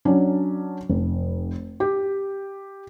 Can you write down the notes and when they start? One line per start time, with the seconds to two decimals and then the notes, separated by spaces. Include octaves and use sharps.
0.05 F#3 C#4 D4
0.89 F1
1.80 G4